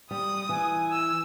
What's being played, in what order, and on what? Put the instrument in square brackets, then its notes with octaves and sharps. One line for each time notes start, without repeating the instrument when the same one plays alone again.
[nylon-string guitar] G3 [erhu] D#6
[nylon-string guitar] E3 [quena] G#5
[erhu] E6